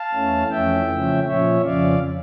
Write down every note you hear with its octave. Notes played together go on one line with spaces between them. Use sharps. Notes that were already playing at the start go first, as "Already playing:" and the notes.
Already playing: F5 A5
E2 E3 A3 C#4
F2 E3 A3 C#4 E5 G5
C#3 F3 A3 C#4
A#2 F3 C#4 C#5 E5
F2 C#3 F3 C#4 D5 F5